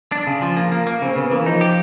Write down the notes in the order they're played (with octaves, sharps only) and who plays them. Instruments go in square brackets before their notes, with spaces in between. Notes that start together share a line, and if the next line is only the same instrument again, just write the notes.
[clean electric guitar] D4
C#3
F3
A#3
A#3
A#3
[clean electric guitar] C#3 [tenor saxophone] C4
[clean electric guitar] C#3 [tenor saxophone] B3
[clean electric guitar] E3 [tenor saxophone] A#3
[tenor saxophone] F3 [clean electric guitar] D#4
[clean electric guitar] G4